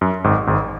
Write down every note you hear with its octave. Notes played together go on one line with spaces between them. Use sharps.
F#2
G#1 G#2
G#1 G#2